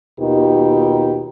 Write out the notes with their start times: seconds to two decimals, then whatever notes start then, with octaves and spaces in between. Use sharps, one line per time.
0.20 D#2 B2 D#3 D#4 F4 G4